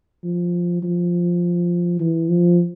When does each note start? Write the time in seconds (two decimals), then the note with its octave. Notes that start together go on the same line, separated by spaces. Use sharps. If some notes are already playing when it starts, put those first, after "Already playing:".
0.24 F3
0.83 F3
2.00 E3
2.29 F3